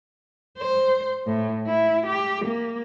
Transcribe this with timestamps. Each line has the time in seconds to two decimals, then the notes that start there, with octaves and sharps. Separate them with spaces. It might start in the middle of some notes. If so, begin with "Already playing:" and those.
0.58 C5
1.27 A2
1.67 E4
2.07 G4
2.45 A#3